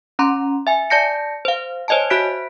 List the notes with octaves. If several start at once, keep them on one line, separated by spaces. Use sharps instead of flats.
C#4 A#5 C6
E5 G#5
D5 A5 G6 A#6 C#7
C5 F5
C5 C#5 D#5 G#5 A5
F#4 C5 E5 F#6 B6 D7